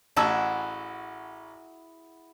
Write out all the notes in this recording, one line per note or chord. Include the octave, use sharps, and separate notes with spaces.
A1 E4 F#4 G#4 A5 E6